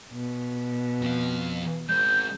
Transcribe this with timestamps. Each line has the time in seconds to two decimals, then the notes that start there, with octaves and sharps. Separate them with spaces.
0.13 B2
1.02 F2 F5
1.89 G#3 C4 G6